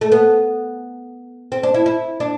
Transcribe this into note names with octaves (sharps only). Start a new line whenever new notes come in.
A3
B3
C4
D4
E4
E4
D4